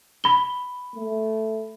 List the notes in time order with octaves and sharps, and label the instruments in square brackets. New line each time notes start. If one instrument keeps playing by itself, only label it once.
[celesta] B5 G7
[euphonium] A3